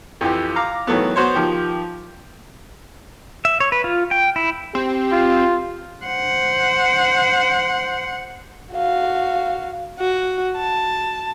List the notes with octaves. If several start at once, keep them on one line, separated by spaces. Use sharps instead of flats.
F2 E3 G4
F5 A#5 D6
D#3 E3 F#3 A3 B3
B3 F#4 C5 C#5
D#3 F3 G4
E5
C#5
B4
F4
G5
E4
C4 G4
F4
C5 F#5
F#4 F5
F#4
A5